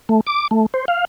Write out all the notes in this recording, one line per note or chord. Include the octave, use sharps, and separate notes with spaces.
A3
D6
A3
C5
F5